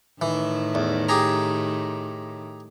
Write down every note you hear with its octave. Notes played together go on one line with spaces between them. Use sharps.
A2 D#3 E3
E2
G4 G#4 A#5